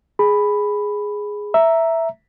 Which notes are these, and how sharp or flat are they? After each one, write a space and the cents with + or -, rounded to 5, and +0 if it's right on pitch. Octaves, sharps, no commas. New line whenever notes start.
G#4 +0 B5 +0
E5 +0 A#5 +0